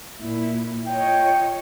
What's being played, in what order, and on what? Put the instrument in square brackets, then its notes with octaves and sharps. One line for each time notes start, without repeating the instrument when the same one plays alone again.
[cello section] A#2 E4
[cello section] F4 C#5 D#5 [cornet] G5